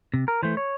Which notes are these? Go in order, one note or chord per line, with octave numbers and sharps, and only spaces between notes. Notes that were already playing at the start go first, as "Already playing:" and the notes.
C3
A#4
E3 A3 C5
C#5